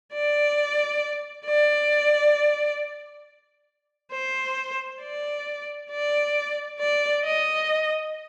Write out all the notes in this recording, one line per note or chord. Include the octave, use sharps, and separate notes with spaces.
D5
D5
C5
D5
D5
D5
D#5